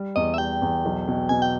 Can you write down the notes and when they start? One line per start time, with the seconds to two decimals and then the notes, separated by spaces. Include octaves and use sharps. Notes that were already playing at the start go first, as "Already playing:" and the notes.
Already playing: G3
0.16 E2 D#5
0.34 E5
0.38 G3 G5
0.62 E2
0.85 B1
1.08 B2
1.29 B2 G#5
1.42 G5